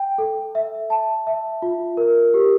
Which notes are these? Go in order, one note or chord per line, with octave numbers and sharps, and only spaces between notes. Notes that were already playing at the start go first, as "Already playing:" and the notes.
Already playing: G5
A4
E5
A5
E5
F4
A#4
G4